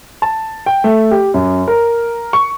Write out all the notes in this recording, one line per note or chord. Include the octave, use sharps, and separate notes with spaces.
A5
G5
A3
G4
F#2
A#4
C#6